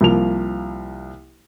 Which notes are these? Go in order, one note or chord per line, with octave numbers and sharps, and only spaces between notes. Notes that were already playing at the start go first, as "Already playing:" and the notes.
C2 F3 A#3 F7